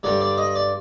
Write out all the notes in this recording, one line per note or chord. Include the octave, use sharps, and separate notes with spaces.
G2 D3 G3 D5
D5
D#5
D5